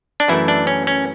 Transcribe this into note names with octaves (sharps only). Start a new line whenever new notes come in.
D4
F#2 E3 A3 E4
D4
C#4
C#4